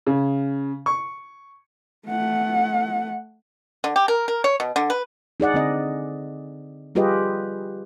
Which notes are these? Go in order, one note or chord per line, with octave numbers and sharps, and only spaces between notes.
C#3
C#6
A3 F#5
D3
G4
A#4
A#4
C#5
B2
D3
B4
D#4 G#4 D5 F#5
D3 C4 D#5
G3 F4 G4 G#4 B4 D#5